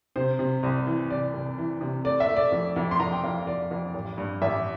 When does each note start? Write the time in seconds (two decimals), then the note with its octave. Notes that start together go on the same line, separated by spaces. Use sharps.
0.16 C3 C5
0.39 C3
0.63 C2
0.87 E3
1.10 C2 D5
1.34 C2
1.58 E3
1.81 C3
2.04 A3 D5
2.20 E5
2.29 A3
2.36 D5
2.52 F2
2.76 F2
2.91 C6
3.00 F2 A#5
3.12 G5
3.24 F2 F5
3.47 F2 D5
3.71 F2
3.94 A1
4.18 G2
4.42 A1 E5